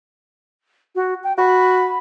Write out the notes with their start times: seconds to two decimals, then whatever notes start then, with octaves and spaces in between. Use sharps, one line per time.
0.95 F#4
1.24 G5
1.38 F#4 B5